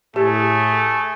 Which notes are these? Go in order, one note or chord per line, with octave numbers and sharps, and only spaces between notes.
A2 A3 G4 G#4